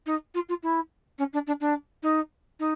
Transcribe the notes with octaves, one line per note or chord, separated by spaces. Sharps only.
D#4
F4
F4
E4
C#4
D4
D4
D4
D#4
D#4